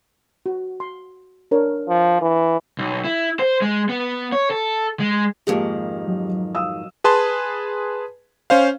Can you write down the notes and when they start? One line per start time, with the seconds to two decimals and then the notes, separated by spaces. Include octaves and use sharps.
0.46 F#4
0.80 C6
1.51 D4 A#4 C#5
1.89 F3
2.21 E3
2.78 B1
3.04 E4
3.39 C5
3.62 G#3
3.89 B3
4.32 C#5
4.51 A4
5.00 G#3
5.47 F2 G#2 D#3 A#3 G4 G#4
6.07 F#3
6.55 F5 D#6 E6
7.04 G#4 B4 A5 C6
8.50 C#4 C5 F5